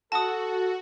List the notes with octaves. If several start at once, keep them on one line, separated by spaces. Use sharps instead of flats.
F#4 A4 A5 D#6